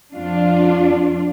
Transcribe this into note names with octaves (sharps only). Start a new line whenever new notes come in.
F2 D4 F4